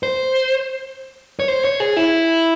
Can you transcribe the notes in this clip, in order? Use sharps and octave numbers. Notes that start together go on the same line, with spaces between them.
C5
C#5
C5
C#5
G#4
E4